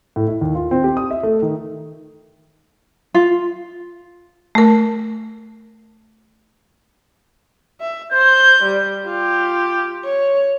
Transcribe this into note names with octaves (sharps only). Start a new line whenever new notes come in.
A2
E4
D#2
F4
C4
G4
D#6
E5
A3
D#3
F4
A3 A#4
E5
C5 G6
G3
F4 G4
C#5